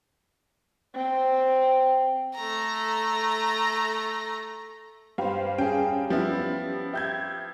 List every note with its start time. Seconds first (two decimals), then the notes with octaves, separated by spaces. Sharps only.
0.95 C4
2.35 A3 A#5
5.18 G2 G4 B4 C5 F5
5.58 C#4 G#4 G5
6.10 F3 G3 B3 E4
6.94 G4 E5 G6 G#6